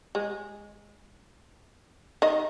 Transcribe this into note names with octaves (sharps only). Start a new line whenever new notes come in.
G#3
D#3 D#5